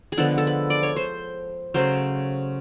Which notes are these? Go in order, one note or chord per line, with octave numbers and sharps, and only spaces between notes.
G#4
D3 F3 G#3 B3 A4
A4
B4
D5
C#5
C5
C#3 F#3 A3 C5